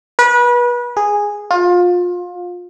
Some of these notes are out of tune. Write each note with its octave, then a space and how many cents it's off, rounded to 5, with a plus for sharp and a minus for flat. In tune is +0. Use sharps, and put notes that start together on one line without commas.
B4 -30
G#4 -10
F4 +25